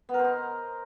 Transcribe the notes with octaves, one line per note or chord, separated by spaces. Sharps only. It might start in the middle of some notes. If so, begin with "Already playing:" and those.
B3
A#4
C5
D#5